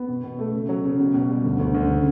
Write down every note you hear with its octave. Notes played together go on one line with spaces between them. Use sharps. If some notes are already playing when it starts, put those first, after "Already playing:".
Already playing: B3
B2
B2
A3
C#3
F#3
C#3
B2
B2
G3
D2
D2
D2
C#3